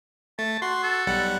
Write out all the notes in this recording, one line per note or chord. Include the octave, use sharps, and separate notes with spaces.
A3 A5
F#4 C6
A4
B1 G3 F#5